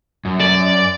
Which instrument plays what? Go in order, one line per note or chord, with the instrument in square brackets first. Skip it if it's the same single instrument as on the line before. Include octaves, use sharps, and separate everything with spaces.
[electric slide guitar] F#2
[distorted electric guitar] D5